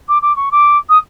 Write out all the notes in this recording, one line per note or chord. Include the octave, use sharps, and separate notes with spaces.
D6
D6
C#6
D6
D#6